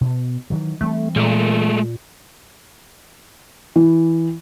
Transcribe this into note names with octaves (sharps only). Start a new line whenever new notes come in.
B2
D#3 E3 F#3
E3 G3 A3 C4
A#2 G#3 A3
E3